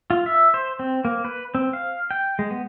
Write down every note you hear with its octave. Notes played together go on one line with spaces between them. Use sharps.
F4
E5
C5
C4
A#3
B4
C4
F5
G5
G#3
B3